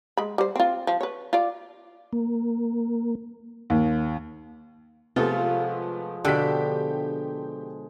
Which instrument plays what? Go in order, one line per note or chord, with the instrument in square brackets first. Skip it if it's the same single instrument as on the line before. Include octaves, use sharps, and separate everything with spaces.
[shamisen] G#3 B5
G3 C5
C4 F4
F3
B4 C#5
F4 D5
[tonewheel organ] A#3
[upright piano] D#2
[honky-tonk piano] C3 A3 B3 [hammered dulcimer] F3 G#3 [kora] F4 A4
[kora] B2 D4 [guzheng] D3 [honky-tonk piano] G4 B6